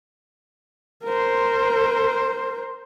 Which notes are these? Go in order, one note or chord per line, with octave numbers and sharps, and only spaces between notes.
A#4 C5